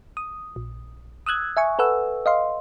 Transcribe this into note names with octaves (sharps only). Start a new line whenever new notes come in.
D#6
A#1
D#6 E6 F#6 G#6
E5 G#5 C#6
A4 B4 F#5 E6
D#5 F5 C6